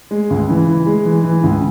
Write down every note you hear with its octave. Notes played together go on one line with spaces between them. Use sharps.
G#3
C#2
E3
E3
G#3
E3
E3
C#2